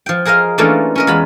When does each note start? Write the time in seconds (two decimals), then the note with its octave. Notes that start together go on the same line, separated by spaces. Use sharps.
0.06 F3 G5
0.25 G#4 A#4 C5 D#5 F5
0.58 E3 A3 A#3 C#4 D4 F4
0.95 C#4 A#4 D#5
1.07 E2 G#3 F4 B5